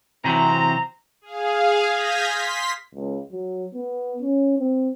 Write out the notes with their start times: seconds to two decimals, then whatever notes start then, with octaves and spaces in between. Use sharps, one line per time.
0.24 C3 E3 F#3 C4 A#5
1.21 G#4 F5
1.88 D#6 F6 G6 G#6 A#6 B6
2.26 C6 B6
2.94 C#2
3.31 F#3
3.74 B3
4.22 C#4
4.59 C4